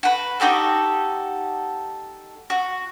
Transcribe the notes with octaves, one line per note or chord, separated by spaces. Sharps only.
F#4 B4
D#4 F#4 G4 A4
F#4